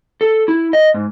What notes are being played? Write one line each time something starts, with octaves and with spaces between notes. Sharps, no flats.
A4
E4
D#5
G#2